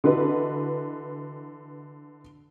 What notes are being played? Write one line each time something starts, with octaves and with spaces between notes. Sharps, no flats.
D3 E3 F#4 B4 D#5